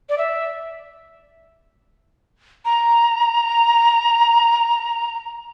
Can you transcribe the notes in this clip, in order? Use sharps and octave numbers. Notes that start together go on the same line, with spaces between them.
D5
E5
A#5